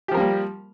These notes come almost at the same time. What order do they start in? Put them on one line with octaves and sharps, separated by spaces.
G4 F3 A#4 A#3 G3